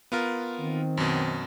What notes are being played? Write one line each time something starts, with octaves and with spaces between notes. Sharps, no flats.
B3 F4 A#4
D#3 C4
F#2 B2